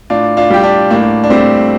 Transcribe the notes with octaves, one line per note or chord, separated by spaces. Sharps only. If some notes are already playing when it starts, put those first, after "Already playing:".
A2 D4 F4
D4 F4
G3 G4
D4 F4
A2 A#3 D4
D4
G3 A3 C4